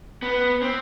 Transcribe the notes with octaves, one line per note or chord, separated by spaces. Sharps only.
B3
C4